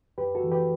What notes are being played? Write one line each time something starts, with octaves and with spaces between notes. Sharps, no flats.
F#2 G4 B4
F#4 A4
E3
G4 B4